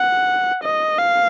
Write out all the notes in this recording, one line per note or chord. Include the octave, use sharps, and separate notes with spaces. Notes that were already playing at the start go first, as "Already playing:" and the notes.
Already playing: F#5
D#5
F5